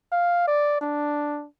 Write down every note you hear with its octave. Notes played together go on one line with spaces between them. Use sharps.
F5
D5
D4